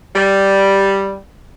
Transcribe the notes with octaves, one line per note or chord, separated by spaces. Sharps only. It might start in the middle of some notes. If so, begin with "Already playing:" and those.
G3